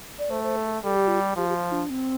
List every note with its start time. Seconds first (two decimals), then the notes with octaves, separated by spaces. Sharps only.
0.19 D5
0.30 A3 C5
0.43 C5
0.56 A4
0.70 A4
0.83 G3 A4
0.96 G4
1.08 F4
1.21 G4
1.36 F3 G4
1.49 G4
1.55 F4
1.72 D4
1.90 C4